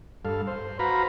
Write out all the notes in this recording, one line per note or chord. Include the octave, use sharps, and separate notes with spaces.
G2 A4 F5
C5
F#4 B4 C5 F5 A#5 B5